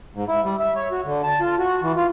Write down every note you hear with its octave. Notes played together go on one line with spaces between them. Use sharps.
G#2
E4
G3
E5
C#5
F#4
D3
A5
F4
F#4
E3
F4